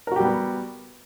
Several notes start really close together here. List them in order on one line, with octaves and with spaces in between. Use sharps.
A#4 F#4 G4 G3 B3